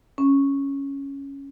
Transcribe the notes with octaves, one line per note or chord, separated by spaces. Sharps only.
C#4